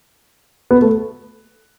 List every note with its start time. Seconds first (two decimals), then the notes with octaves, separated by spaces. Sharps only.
0.71 B3
0.82 A3